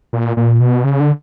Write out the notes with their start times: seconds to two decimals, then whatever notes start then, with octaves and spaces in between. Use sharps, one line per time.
0.13 A#2
0.37 A#2
0.60 B2
0.84 C#3
1.00 D3